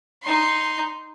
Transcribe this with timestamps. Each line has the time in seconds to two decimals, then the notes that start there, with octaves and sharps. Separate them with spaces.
0.22 D#4 C6